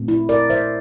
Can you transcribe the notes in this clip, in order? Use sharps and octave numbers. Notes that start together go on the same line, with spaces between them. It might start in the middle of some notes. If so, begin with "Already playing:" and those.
Already playing: A#2 A3 C4
E4
A#4 D5
C5 E5